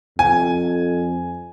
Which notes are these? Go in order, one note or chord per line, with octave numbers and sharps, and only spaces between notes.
F2 G#5